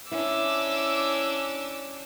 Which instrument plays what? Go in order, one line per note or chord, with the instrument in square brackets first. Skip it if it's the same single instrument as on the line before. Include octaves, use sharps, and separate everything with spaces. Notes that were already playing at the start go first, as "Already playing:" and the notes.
[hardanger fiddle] C#4 D4 [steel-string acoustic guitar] E4 [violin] D6 E6